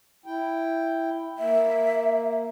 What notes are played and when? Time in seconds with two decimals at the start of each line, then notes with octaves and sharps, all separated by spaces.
0.26 E4 G5
1.38 A#3 E5